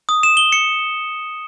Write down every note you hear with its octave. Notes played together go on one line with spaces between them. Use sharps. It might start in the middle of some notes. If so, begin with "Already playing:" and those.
D#6
E7
G7
C#7